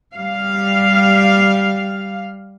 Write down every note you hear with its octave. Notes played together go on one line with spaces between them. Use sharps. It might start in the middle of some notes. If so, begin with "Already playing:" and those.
G3 F5